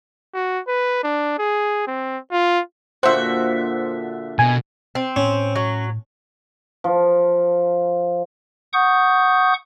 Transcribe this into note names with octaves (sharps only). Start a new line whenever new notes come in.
F#4
B4
D4
G#4
C4
F4
A#2 D3 F#4 C5 E5
B2 G#5
C4
A2 C#4
F#3
F3
F#5 C#6 D#6 G6